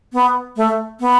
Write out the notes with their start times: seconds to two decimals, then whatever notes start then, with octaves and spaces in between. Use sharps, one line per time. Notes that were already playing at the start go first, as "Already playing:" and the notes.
0.13 B3
0.57 A3
1.00 B3